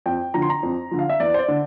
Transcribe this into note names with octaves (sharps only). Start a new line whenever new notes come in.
F2 G5
D3 F3 A#5
C6
A#5
F2
D3 F3
F5
E5
E2 D5
C5
D5
D3